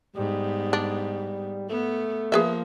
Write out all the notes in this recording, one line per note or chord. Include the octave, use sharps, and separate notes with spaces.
G#2 G3 B3
D4
A3 B3
F3 A#3 G#4 B4 E5